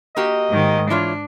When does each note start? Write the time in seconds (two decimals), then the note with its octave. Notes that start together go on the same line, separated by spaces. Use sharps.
0.16 A#3 F#4 G4 D#5
0.50 G#2 D#3
0.90 E3 D4 F4 C#5